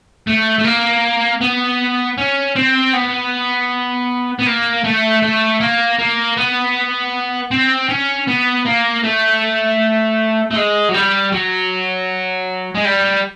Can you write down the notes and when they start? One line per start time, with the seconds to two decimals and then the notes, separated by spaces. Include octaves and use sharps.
0.27 A3
0.59 A3
0.65 A#3
1.41 B3
2.18 C#4
2.56 C4
2.93 B3
4.39 B3
4.46 A#3
4.84 A3
5.22 A3
5.60 A#3
5.99 A#3
6.37 B3
7.51 C4
7.89 C#4
8.27 B3
8.65 A#3
9.03 A3
10.51 A3
10.56 G#3
10.89 F#3
10.94 G3
11.32 F#3
12.75 G#3
12.85 G3